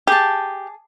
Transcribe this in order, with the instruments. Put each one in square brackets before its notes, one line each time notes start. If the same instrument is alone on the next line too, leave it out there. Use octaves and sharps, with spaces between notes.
[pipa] G4 [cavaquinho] G#4 A5